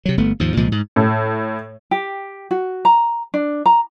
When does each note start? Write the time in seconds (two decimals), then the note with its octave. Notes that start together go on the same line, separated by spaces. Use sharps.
0.05 C3 F#3
0.18 G1 A3 B3
0.40 D#2 G#2 F3
0.57 C2 A#2 F3 G#3
0.72 G#2
0.96 A2
1.91 G4
2.51 F#4
2.85 A#5
3.34 D4
3.66 A#5